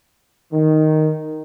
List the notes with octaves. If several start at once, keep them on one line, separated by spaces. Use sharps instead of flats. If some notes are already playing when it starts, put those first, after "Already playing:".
D#3